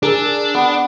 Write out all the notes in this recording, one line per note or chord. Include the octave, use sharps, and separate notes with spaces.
D4 G#4 A#4 E6
B3